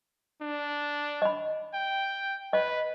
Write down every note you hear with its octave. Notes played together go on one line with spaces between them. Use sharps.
D4
D#5 B5
G5
B4 D#5